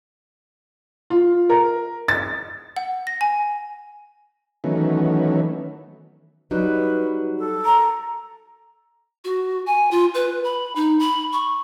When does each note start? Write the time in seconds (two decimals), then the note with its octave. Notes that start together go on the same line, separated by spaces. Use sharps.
1.10 F4
1.49 A#4
2.08 A6
2.76 F#5
3.07 A#6
3.21 G#5
4.64 D#3 E3 F#3 A3 B3 C#4
6.51 F#3 G3 D#4 B4
7.39 A4
7.66 A#5
9.24 F#4
9.66 G#5
9.91 F4
10.14 B4
10.44 B5
10.75 D#4
10.99 B5
11.32 C#6